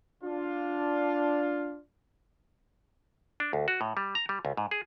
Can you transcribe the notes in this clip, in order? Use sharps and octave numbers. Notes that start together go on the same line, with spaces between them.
D4 F4
D4
D2
F#4
A2
G3
A#5
G3
C#2
G#2
G#4